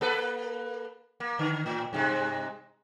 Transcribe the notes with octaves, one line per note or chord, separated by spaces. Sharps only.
A#3 A4 B4
A#3
D3
A2
G2 C3 G#3